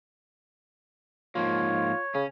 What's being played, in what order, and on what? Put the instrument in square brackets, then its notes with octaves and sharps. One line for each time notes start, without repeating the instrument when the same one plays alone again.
[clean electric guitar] G#2 F3 A#3 [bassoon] F4 [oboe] C#5
[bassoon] C#3 [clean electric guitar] C#4